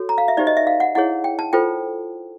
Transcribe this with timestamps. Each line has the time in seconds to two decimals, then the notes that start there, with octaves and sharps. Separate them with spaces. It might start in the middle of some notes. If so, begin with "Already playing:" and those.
Already playing: F#4 A4 C#5
0.09 A#5
0.18 F5
0.28 E5
0.37 D#4 G4 C5 D5
0.47 D#5
0.57 E5
0.67 F5
0.80 F#5
0.95 E4 G#4 C#5 F#5
1.24 G5
1.39 A5
1.53 F4 A4 C5 G5